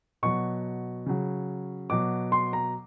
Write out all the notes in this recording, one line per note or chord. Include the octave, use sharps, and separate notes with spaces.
B2 F#3 C#6
C#3 F#3
B2 F#3 D6
C6
A#5